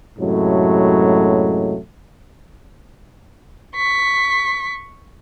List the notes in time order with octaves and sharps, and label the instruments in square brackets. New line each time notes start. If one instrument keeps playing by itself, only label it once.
[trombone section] F#2 A2 C3 F#3 G#3 A3
[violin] C#6 B6